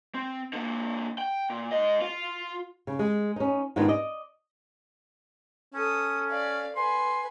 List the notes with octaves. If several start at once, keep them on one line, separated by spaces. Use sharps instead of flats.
C4
D3 A#3
G5
A#2
G#2 D#5
F4
C#3
G#3
C#4 D#4
G#2 D#3 G#3 B3 D4 F4
D5 D#5
C#4 A4 D#6
D5 F5
B4 G#5 C6